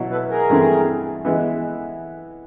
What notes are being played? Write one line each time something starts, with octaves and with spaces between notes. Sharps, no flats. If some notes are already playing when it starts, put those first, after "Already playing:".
Already playing: B2 F#3 B3 E4
A4 B4
G#4 A#4
G2 E3 A3 C4 E4
E3 G#3 B3 E4